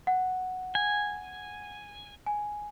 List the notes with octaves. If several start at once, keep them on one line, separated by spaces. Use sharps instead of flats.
F#5
G#5
G#5